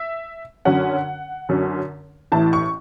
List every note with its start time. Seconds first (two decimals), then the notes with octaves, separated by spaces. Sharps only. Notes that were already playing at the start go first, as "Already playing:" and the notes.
Already playing: E5
0.65 F#2 D3 F#3 C#4 F#5
1.49 F#2 D3 F#3 C#4
2.32 A1 A2 E3 A5
2.53 C#6